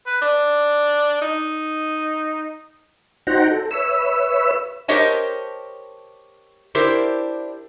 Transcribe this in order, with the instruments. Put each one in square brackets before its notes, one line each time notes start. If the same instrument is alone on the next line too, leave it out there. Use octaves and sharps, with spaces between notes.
[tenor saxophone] B4
D4
D#4
[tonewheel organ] D#4 F#4 C5 F#5 G5 A#5
A4
B4 C#5 E5 E6
[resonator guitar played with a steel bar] G4 A#4 C5 C#5 D#5 A5
D4 E4 G4 A#4 C5